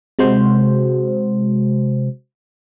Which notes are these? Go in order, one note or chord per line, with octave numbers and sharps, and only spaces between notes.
C3 G#3 F#4 C5